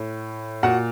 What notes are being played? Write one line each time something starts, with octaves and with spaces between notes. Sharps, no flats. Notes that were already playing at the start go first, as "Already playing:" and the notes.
Already playing: A2
A#2 F#4 F#5